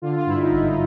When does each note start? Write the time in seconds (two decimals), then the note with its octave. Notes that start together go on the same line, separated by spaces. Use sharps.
0.02 D3 F4
0.16 F4
0.26 G2 E4
0.42 D#4
0.51 G#1 E4
0.68 D#4